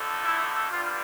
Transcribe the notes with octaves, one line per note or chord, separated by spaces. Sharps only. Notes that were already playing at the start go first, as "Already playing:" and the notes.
Already playing: F2 D3 A3
E4
G2 D3 G3 F4